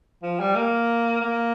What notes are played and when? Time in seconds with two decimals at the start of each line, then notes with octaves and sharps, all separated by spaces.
0.23 F3
0.40 G3
0.55 A#3
1.21 A#3